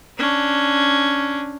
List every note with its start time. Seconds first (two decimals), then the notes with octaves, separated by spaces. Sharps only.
0.18 C#4 D4